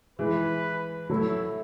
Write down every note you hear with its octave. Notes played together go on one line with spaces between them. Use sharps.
E3 G#3 B4
F#3 A3 E4